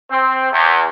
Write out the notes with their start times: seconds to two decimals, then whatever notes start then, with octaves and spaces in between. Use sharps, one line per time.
0.11 C4
0.52 E2